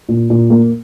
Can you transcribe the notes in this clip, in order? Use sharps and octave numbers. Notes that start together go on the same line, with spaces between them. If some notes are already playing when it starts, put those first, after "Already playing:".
A#2
A#2
A#3